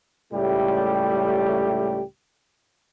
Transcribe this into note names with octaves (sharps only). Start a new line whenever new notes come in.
C#2 A2 G3 A3 G4